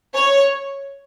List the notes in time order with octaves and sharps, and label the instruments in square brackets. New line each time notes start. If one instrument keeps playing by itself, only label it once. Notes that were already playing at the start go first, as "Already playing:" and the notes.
[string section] C#5